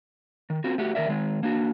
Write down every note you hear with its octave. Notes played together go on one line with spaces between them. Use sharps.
D#3
C4 F4 F#4
A3 F#4 G4
D#3 E3 A#4 D5 E5
D#3 G#3
A#3 D4 F#4